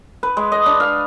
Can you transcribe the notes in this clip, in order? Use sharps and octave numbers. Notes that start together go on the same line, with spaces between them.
B4
G#3
D#5
D4
F5